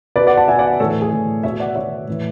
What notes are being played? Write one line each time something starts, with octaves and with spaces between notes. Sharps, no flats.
B2 B4 D5
D5 F#5
F#5 A5
B2 E5 G#5
D5 F#5
A2 E3 A4 C#5
A4
G#4
A2 E3
B2 C#5 E5
D5 F#5
B2 C#5 E5
A2 E3